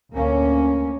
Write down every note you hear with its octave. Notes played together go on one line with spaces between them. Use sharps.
D2 A#3 C#4